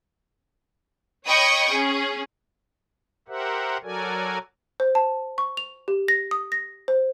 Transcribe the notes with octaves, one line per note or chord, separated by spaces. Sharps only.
C#5 D#5 G5 B5 C#6 D#6
C#4 G#4
G4 A#4 C5 E5 F#5
F#3 F#4 A4 A#4 D5 G#5
C5
A5
C#6
F7
G4
A#6
D#6
A#6
C5